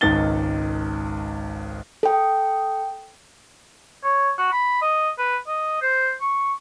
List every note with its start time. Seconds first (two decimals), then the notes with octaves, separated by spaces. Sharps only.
0.01 G#1 C#2 D#3 D#4 A6 G7
2.03 A4 G5
4.04 C#5
4.38 F#4
4.52 B5
4.82 D#5
5.18 B4
5.47 D#5
5.82 C5
6.21 C#6